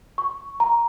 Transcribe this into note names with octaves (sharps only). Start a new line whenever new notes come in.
C#6
A#5